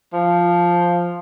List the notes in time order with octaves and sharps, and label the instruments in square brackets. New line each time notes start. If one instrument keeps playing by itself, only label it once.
[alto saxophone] F3